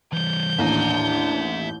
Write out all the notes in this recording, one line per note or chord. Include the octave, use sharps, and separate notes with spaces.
E3 G3 G6
A1 D#2 D4 E5 A#5